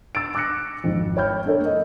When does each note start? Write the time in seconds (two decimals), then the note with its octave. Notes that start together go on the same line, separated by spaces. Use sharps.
0.15 E6 A6 D7
0.35 D6 E6 F#6 A#6 C#7
0.84 G#1 F2
1.17 C#5 G5 B5 F6 G6
1.46 D4 A4 A#4 C#5
1.61 A3 D#5